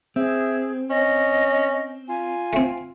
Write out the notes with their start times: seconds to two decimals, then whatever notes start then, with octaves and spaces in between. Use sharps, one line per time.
0.16 C4 G#4 E5
0.90 C#4 D#5
2.08 F4 G#5
2.53 A3 C4